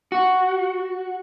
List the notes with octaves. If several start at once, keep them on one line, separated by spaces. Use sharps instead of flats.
F#4